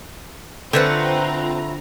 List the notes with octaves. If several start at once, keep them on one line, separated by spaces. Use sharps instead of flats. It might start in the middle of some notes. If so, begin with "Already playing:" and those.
D3 A3 C4 F4 B4 C5 F#5 A#5